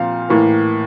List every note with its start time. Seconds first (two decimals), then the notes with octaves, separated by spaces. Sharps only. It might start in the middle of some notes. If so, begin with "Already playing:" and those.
Already playing: A#2 F3 C4 F5 A#5
0.29 A2 E3 A#3